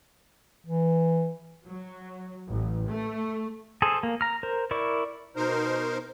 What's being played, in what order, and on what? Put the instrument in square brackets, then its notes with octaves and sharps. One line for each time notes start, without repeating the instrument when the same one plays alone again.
[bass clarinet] E3
[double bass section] F#3
A1
A3
[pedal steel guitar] G#4 A4 C5
A#3
A#5 F6
A#4 C5
E4 A#4 D5 C#6
[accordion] B2 D#4 A#4 C5